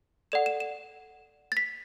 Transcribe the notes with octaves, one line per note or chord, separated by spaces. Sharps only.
A4 D5 F#5 E7
E7
E7
A6
B6